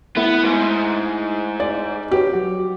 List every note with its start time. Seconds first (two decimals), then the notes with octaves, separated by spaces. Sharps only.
0.16 A3 B3 E4
0.45 G#2
1.60 D5
2.11 F#4 G4 B4 C#5
2.33 F#3 F#4